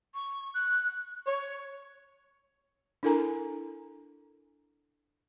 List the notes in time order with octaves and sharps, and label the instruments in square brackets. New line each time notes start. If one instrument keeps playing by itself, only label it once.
[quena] C#6
F#6
[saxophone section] C#5
[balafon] D4 E4 A4 A#4 G#5 A#5